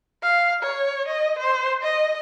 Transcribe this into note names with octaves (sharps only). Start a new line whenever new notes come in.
F5
C#5
D#5
C5
D#5